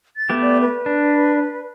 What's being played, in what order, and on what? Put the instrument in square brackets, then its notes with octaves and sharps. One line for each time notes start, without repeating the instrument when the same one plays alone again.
[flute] A6
[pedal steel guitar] A3 B3 G4
[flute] D5
B4
[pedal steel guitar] D4